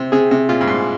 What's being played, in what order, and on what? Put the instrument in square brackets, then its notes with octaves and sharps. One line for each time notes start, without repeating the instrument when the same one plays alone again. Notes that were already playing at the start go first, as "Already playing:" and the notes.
Already playing: [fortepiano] C3 [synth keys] C4
[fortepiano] C3 [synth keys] G#4
[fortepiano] C3
[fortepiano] A#2 [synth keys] F4
[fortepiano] G2
G#2